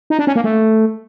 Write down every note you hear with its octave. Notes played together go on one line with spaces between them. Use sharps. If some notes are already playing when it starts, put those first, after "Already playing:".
D#4
D4
C#4
A#3
A3